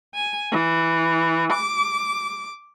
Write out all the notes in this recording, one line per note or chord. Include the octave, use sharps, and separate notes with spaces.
G#5
E3
D6